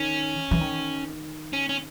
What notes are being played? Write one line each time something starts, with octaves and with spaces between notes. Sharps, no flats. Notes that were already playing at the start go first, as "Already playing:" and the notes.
Already playing: D#3 C#4
E3
D#3
C#4
C#4